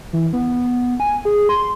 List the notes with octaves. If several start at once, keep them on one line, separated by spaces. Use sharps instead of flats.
E3
B3
G#5
G#4
C6